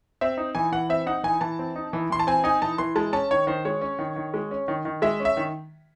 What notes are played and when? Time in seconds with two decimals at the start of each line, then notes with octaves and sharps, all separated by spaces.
0.21 C4 E5
0.37 D#4
0.55 E3 G#5
0.72 E3 F#5
0.89 C4 E5
1.06 D#4 F#5
1.23 E3 G#5
1.41 E3 A5
1.59 C4
1.76 D#4
1.93 E3
2.10 E3 C6
2.19 A5
2.27 C4 G#5
2.44 D#4 G#5
2.62 E3 A5
2.78 E3 C6
2.96 G#3 A5
3.13 C#4 A5
3.31 D#3 C#5
3.47 D#3 C5
3.65 G#3 C#5
3.81 C#4
3.99 D#3
4.16 D#3
4.34 G#3
4.51 C#4
4.68 D#3
4.85 D#3
5.02 G#3 E5
5.20 C#4
5.25 E5
5.37 D#3